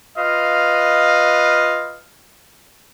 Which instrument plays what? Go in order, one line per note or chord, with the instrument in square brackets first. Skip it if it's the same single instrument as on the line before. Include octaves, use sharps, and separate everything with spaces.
[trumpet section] F4 B4 D#5 F5